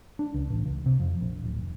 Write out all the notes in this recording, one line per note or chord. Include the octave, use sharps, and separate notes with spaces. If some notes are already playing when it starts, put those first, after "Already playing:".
D4
C#2
A1
C#2
C3
F2
A#1
D1
E1